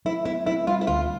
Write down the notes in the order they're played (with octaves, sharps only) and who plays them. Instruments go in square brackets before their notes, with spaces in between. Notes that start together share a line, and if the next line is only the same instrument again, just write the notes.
[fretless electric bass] F#3 [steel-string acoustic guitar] E4
[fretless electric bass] B3 [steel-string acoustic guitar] E4
[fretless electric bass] C4 [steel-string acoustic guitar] E4
[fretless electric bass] G3 [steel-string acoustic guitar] F4
[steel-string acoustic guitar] E4
[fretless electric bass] D2 [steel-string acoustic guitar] F4